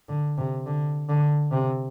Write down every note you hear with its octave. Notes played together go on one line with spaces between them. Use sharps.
D3
C3
D3
D3
C3